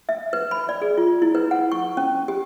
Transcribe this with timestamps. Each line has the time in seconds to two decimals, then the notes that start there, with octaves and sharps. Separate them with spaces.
0.09 E5
0.33 B4
0.51 B5
0.69 D5
0.81 G#4
0.97 F4
1.22 E4
1.35 B4
1.51 F#5
1.72 C#6
1.97 C#4
2.28 G4